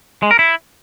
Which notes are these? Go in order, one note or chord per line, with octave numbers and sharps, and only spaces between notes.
G#3
A#4
E4